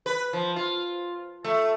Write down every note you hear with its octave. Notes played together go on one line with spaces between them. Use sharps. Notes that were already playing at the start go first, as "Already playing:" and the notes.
B4
F3
F4
A3